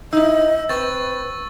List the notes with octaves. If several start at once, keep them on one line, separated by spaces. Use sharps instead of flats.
D#4 E4 D#5 E6
C4 B4 C#6 A6